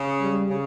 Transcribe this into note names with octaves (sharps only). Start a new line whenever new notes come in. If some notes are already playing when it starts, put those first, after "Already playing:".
Already playing: C#3
G3
C#3